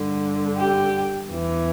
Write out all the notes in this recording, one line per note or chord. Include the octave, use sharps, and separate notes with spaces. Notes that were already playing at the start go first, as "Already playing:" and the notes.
Already playing: G2 D3
G4
E2 E3